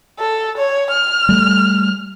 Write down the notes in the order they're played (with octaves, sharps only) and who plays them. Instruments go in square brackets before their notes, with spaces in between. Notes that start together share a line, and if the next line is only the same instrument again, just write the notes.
[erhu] A4
C#5
F6
[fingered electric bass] G3 A3